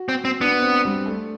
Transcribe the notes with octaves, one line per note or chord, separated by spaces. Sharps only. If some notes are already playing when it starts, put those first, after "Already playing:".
Already playing: F#4
C4
C4
B3 D4
C4
G3
A3